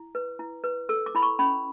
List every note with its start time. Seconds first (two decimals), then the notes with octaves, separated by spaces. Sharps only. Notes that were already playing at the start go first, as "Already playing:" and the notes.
Already playing: E4
0.15 B4
0.39 E4
0.64 B4
0.89 A4 E6
1.06 D6
1.15 E4 B5
1.22 C#6
1.39 C#4 B5